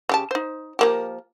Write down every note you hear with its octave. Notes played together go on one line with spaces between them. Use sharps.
C#3 G4 A5
D#4 C5
F3 A#3 G4